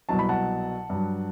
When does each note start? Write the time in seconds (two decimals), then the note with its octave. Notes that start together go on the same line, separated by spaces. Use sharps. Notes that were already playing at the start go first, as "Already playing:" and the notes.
0.09 C2 B2 F#3 A5
0.19 B5
0.29 F#5 A5
0.90 G2 F#3